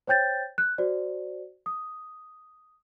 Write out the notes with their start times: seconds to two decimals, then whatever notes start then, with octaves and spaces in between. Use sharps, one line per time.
0.07 C5 C#5 G5 G6 A6
0.58 F#6
0.78 F#4 C5 D5
1.66 D#6